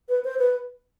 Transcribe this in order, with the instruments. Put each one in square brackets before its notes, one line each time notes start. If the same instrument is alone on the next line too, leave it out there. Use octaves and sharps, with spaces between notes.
[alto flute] B4
C5
B4